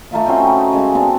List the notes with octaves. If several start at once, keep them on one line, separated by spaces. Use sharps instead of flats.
A3 D#4 F4 E5
C4 C#4 F#4 G5
D#4
C#3 G#3
B3 C4 D4